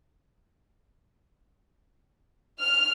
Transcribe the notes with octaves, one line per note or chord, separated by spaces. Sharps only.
F6